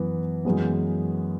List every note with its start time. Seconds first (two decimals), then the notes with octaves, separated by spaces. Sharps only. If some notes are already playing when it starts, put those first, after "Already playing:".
Already playing: F#2 E3 B3
0.45 F#2 E3 G#3 B3